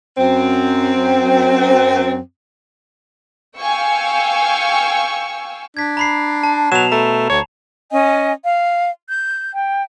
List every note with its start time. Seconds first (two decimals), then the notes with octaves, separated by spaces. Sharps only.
0.17 F#2 C4
3.58 F5 G5 G#5 C#6 E6
5.77 D4 G#6 B6
5.97 A#5 B5 C7
6.43 A5
6.72 B2 F#3 E7 F7
6.92 A3 A#5
7.30 D2 C#5
7.91 C#4 D#5 G#5
8.44 F5
9.10 G6
9.53 G5